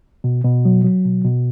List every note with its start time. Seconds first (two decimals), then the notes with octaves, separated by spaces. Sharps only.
0.24 B2
0.44 B2
0.65 F#3
0.84 F#3
1.05 B2
1.24 B2